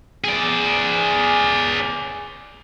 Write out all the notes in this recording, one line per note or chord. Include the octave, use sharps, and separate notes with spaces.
G#4 D5